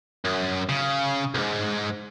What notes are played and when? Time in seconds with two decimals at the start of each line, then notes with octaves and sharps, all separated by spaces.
0.25 F#2
0.69 C#3
1.34 B1 G#2